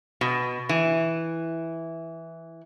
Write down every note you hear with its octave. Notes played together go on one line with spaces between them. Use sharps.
B2
E3